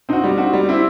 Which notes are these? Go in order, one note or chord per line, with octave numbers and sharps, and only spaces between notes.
C4 D#4 F#4
G3
C4 D#4 F#4
G3
C4 E4